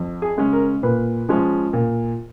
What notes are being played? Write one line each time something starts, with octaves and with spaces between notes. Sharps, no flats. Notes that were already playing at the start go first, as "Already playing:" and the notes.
Already playing: F2
G#4
C#3 G#3 C#4
A#4
A#2 B4
F3 G#3 C#4
A#2